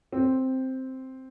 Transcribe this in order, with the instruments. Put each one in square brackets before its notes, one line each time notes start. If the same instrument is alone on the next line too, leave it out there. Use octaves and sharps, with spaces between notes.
[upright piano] C4